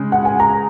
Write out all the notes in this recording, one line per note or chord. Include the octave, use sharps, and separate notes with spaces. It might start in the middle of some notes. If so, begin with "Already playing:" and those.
Already playing: C#3 G#3
F#5
G#5
A#5